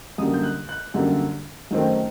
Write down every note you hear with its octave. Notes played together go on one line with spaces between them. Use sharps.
F#2 D3 G3 A#3 D#6
G6
F#6
F#6
F#2 D3 G3 A#3
F#2 D#3 A3 C4